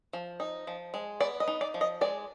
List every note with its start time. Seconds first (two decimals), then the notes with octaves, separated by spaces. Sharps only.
0.13 F3
0.40 D#4
0.67 F3
0.94 G#3
1.20 B3 D5
1.40 D#5
1.48 D#4
1.61 D5
1.74 F3
1.81 D#5
2.01 G#3 D5